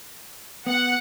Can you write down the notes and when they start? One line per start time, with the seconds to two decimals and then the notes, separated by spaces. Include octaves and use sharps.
0.66 B3 F#5